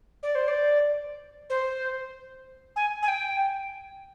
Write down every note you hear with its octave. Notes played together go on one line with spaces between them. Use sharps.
D5
C5
D5
C5
G#5
G#5
G5